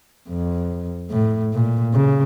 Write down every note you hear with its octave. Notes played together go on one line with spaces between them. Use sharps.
F2
A2
A#2
C#3